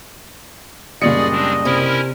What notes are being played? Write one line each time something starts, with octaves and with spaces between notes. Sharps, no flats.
F#1 A#2 G3 G#4 D5 D#5 C#7
G#3 C4 D4
C3 C#4 E4 A#4